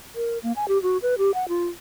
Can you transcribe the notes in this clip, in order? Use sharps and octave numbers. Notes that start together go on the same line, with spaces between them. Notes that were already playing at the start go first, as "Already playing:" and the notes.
A#4
A#3
G#5
G4
F#4
B4
G4
F#5
F4